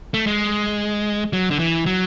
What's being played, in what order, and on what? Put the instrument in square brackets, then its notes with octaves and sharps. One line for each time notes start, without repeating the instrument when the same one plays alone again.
[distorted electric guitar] A3
G#3
F#3
D3
E3
F#3